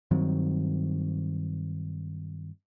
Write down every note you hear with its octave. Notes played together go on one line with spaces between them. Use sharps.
G2 D#3 F#3 C4